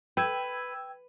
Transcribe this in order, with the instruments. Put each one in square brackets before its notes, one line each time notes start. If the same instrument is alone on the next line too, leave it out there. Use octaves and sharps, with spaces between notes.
[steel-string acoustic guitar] B4 [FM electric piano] G5 E6 G#6